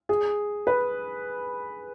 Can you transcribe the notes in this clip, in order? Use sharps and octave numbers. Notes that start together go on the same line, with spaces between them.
G#4
B4